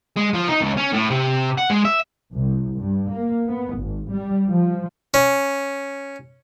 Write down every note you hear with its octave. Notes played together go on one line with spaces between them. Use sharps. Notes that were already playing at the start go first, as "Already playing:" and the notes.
G#3
F3
D#4
C#2
C#4
A2
C3
F#5
G#3
E5
C2
G2
A#3
B3
G#1
G3
F3
C#4